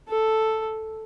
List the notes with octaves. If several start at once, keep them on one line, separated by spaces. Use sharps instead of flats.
A4